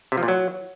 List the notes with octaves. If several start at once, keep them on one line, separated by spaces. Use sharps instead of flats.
C3
F3
A#2
F#3